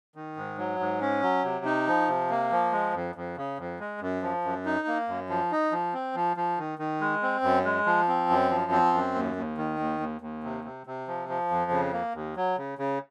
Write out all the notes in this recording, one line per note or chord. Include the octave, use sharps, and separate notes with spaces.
D#3
G#2
F#3
G#2
C#4
F#3
C3
D#4
F3
C3
A#3
F3
G#3
F2
F2
C#3
F2
G#3
F#2
F3
F#2
D#4
A#3
F#2
F3
D#4
F3
C4
F3
F3
D#3
D#3
G#3
C4
F#2
G#3
F3
C4
F#2
F3
C4
F#2
D#2
D#2
D#3
D#2
D#2
D#2
C3
C3
C3
F3
F3
F2
C#3
A#3
D#2
F#3
C#3
C#3